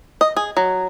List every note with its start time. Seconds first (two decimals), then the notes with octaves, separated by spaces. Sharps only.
0.21 D#5
0.37 G#4
0.57 F#3